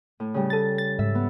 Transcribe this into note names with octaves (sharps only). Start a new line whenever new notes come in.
A2
C#3 G3
A4 A6
A6
G#2 E5
B3